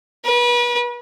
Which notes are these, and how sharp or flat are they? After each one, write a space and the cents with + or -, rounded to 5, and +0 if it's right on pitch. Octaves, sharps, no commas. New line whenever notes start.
B4 -35